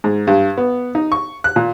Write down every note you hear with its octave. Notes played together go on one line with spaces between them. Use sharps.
G#2
G2
B3
D#4
C#6
F#6
A#2